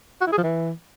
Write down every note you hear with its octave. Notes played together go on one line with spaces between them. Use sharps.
F#4
E4
G#4
F3
E3